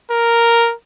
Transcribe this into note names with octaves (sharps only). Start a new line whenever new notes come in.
A#4